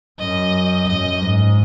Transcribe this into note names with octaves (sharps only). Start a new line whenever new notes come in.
F#2 D#5
F#2 D#5
G#2